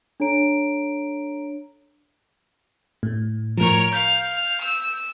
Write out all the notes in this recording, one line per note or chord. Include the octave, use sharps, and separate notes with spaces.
D4 A4 C#5 A#5 D7
A2
A2 F3 A#4 C#5
F5 G6
E6